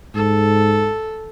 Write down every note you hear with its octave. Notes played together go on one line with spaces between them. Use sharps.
G#2 A4